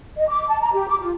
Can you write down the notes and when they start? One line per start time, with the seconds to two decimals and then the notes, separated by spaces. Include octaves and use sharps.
0.17 D#5
0.29 D6
0.48 A5
0.62 A#5
0.74 G4
0.89 D6
1.01 F4